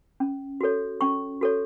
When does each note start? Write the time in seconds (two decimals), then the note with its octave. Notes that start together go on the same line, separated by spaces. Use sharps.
0.20 C#4
0.61 F#4 A4 C#5
1.01 C#4 C#6
1.41 F#4 A4 C#5